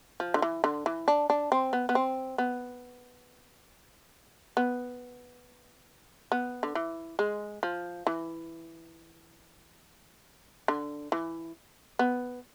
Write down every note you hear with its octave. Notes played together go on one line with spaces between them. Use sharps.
F3
D3
E3
D3
E3
D4
D4
C4
B3
B3
C4
B3
B3
B3
D3
E3
G#3
F3
E3
D3
E3
B3